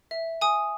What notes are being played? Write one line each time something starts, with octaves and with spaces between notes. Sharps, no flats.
E5
G#5 D#6